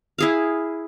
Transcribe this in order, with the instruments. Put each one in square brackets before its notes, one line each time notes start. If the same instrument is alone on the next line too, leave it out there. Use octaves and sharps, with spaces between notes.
[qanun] E4 G#4 F5